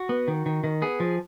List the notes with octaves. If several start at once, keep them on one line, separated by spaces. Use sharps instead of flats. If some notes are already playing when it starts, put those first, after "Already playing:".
Already playing: F#4
B3
D#3
D#3
D#3
B3 G#4
F3